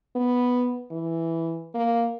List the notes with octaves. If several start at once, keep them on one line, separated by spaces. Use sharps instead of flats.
B3
E3
A#3